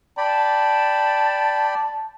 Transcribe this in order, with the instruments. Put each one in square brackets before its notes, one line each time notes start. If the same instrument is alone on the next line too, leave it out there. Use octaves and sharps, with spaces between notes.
[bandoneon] D5 G5 B5 [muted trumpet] A5